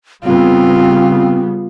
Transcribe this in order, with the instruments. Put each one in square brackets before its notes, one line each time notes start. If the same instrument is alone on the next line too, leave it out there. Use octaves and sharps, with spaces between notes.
[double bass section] C#3 G3 B3 [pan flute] C4 [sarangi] F4